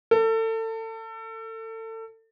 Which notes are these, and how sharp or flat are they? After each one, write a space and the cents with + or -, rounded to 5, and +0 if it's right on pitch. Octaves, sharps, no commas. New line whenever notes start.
A4 +30